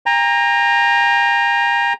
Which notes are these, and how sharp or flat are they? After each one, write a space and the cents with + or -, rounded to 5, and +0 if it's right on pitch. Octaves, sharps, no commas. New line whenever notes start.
G5 +45 A#5 +0